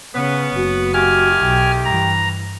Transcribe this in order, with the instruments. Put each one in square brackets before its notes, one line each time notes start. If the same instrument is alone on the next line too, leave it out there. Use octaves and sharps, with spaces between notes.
[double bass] C#3 C#4 [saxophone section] B3
[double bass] F#1 [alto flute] F#4
[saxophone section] D#3 A3 G4 [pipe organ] G#5 F6
[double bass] B1 [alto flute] G5
[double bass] G2 E3 [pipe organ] A#5